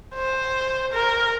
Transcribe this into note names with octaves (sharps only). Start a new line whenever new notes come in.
C5
A#4